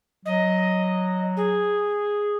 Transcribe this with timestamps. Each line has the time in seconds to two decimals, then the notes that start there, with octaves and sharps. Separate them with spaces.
0.26 F#3 D#5
1.37 G#4